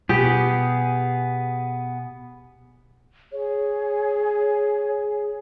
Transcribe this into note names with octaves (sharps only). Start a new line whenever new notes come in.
B2 B3 G4 G#4
G#4 C#5